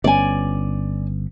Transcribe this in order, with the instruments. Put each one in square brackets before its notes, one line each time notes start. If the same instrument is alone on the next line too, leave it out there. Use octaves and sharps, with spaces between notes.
[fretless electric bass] G1 B3 C#4 [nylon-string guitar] D5 G#5